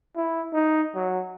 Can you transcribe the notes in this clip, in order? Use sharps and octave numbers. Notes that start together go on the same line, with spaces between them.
E4
D#4
F#3